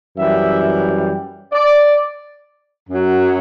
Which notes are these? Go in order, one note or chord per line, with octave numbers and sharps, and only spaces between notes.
F#2 E3 G3 E5
D5
F#2 F#3